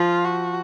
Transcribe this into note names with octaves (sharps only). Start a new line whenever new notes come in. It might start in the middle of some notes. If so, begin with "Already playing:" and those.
Already playing: F3 F4
F#4